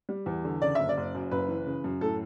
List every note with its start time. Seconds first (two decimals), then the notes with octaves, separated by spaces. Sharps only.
0.09 G3
0.26 E2
0.45 D3
0.62 C#3 D5
0.75 F#1 E5
0.89 D5
0.97 F#1
1.15 F#2
1.31 F#1 B4
1.48 E3
1.67 C#3
1.84 F#2
2.01 A2 A4